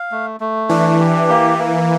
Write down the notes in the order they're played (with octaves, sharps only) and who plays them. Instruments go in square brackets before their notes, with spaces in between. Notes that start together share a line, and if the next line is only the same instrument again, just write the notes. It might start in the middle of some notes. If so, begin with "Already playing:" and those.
Already playing: [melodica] F5
A3
A3
[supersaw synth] E3 [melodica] D4
[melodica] G4
A#3
A#3